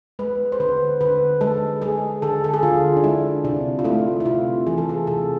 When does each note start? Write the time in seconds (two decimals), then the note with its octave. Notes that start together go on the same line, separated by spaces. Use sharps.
0.19 G#3 B4
0.52 C5
0.60 D3 B4
1.01 D3 B4
1.41 G#3 A4
1.82 G#3 G#4
2.22 D3 A4
2.44 A4
2.54 G#4
2.63 D3 F4
2.96 D4
3.04 G#3 E4
3.44 C3 D4
3.79 F4
3.84 A3 E4
4.20 E4
4.25 C3 F4
4.67 E3 G#4
4.78 A4
4.89 G#4
5.07 C3 A4